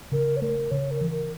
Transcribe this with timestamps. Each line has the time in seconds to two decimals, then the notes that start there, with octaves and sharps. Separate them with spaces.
0.12 C#3 A#4
0.36 C#5
0.42 A3 A#4
0.71 C#3 C#5
0.91 A#4
1.01 E3
1.11 A#4